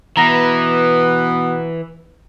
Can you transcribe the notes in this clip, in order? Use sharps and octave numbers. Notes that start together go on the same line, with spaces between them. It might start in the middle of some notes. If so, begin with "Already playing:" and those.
B2 E3 B3 A#5 A#6